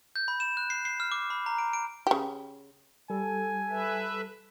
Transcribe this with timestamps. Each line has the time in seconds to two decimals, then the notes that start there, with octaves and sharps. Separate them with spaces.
0.16 G6
0.28 B5
0.40 E7
0.57 F#6
0.70 C7
0.85 C7
1.00 F6
1.12 D6
1.30 B5
1.46 A#5
1.58 D7
1.73 D7
2.07 C#3 G4
3.10 G3 A4 G#5
3.70 B4 E5